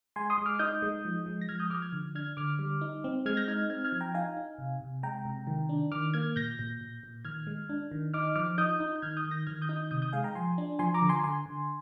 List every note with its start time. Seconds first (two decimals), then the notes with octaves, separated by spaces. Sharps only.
0.16 G#3 G#5 C6
0.30 C6 D#6
0.38 G#3
0.46 D6 F6
0.59 D#4 D#6 G6
0.82 G#3
1.05 F3
1.26 G#3
1.41 A#6
1.48 F3 F6 G#6
1.59 D#6 G6
1.70 F3 D6 F6
1.82 F6 G#6
1.92 D3
2.15 D4 F6 G#6
2.37 D3 D6 F6
2.59 G3
2.81 D#4
3.04 C4
3.26 G#3 F6 G#6
3.37 G6 A#6
3.48 D#4 F6 G#6
3.70 C4 F6 G#6
3.85 F6 G#6
3.92 F3
4.00 G5 A#5
4.14 D#4 F5 G#5
4.37 D#4
4.58 C3
4.81 C3
5.03 G#3 G5 A#5
5.25 C3
5.47 D#3
5.69 D4
5.92 D#3 D6 F6
6.14 A#3 F6 G#6
6.36 A#2 G6 A#6
6.59 A#2
6.81 A#2
7.03 A#2
7.25 D#3 F6 G#6
7.47 G#3
7.69 D4
7.92 D#3
8.14 D#4 D6 F6
8.36 F3 D6 F6
8.58 D#4 D#6 G6
8.80 D#4
8.96 G6
9.02 D#3 F6 G#6
9.17 D#6 G6
9.25 D#3
9.31 G6 A#6
9.47 D#3 F6 G#6
9.62 D#6 G6
9.69 D#4
9.76 D#6 G6
9.91 C3 D#6 G6
10.02 D#6 G6
10.13 G#3 F5 G#5
10.24 G5 A#5
10.35 F3 G#5 C6
10.58 D4
10.79 F3 G#5 C6
10.94 A#5 D6
11.02 D3
11.09 G#5 C6
11.24 D3 G#5 C6
11.46 D3